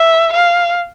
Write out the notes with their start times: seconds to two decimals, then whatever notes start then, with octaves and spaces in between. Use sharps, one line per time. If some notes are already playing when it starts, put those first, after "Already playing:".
Already playing: E5
0.33 F5